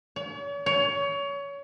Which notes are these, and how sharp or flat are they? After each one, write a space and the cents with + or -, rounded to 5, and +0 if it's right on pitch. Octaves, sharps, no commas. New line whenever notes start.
C#5 +45
C#5 +25